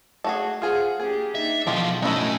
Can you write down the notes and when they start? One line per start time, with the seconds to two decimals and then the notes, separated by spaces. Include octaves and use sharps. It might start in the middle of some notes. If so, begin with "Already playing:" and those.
0.24 A3 F#4 G#4
0.62 F4 G#4 C5 F#5
1.00 A#3 D4 G4 G#4
1.35 D4 D#4 E5
1.67 B2 E3 F3 G#3 F4 G4 A4
2.02 A2 C#4 D#4 F#4 E5 G#5 A5 B5